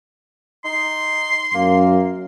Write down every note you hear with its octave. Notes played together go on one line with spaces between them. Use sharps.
D#4 C6
F#2 A#3